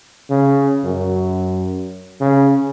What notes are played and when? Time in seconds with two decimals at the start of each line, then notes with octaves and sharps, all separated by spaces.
0.30 C#3
0.84 F#2
2.21 C#3